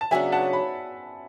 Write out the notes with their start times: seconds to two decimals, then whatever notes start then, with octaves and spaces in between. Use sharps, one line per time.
0.01 A5
0.11 C#3 F#3 B3 D4 E5 G#5
0.32 F#5 A5
0.53 B5